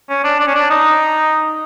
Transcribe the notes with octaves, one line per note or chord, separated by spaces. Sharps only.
C#4
D4
D4
C#4
D4
D#4